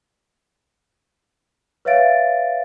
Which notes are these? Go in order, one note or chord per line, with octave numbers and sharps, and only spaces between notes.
B4 C#5 E5 F5 A6 D7